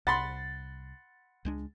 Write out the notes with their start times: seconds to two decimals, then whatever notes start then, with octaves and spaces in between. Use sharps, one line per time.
0.07 C2 F#5 B5 C6 A6
1.45 C#2 G#3 D4